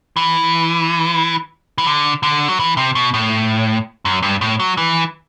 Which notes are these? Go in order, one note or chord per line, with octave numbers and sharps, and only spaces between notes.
E3
E3
D3
D3
F#3
E3
C3
B2
A2
F#2
G2
A2
F#3
E3